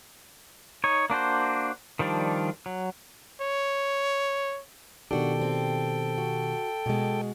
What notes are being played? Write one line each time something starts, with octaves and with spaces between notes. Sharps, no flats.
D#4 C#5
A#3 D4 F#4 C5
D#3 F3 G3 D4
F#3
C#5
B2 D#3 D4 F#4 G4 A4 G5
C4
F#4
B2 G#3